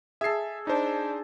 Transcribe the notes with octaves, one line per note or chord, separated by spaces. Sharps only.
G#4 A4 E5 C7
D4 D#4 C5